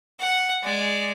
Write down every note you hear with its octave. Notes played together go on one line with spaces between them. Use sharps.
F#5
G#3 D5